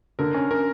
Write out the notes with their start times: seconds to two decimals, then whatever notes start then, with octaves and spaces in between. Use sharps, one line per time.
0.19 D3 A#4
0.34 C#4
0.51 C#4 A#4